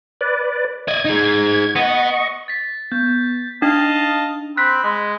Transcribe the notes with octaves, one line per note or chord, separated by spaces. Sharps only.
B4 D5
D5 D#5 G#6
D#4 G#4
B3 D#5 F#5 C#6
A6 B6
B3 G6
D4 D#4 D#5 F5 A5
C4 B5 F#6 B6
G#3